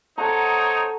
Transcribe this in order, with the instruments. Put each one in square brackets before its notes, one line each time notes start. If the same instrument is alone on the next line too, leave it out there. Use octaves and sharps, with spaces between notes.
[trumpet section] C4 D#4 C#5 [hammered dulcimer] A4 F#5 A#5